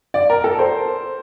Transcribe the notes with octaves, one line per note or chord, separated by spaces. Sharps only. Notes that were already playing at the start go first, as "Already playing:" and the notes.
D5
A#4
A4
C5